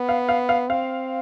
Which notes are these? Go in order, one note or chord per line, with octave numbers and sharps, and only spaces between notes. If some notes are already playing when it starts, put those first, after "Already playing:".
Already playing: B3
F5
F5
F5
C4 F5